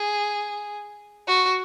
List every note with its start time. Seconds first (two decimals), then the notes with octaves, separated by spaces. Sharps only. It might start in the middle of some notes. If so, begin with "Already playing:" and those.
Already playing: G#4
1.28 F#4